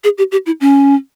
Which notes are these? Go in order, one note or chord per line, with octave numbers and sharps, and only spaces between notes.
G#4
G4
G4
E4
C#4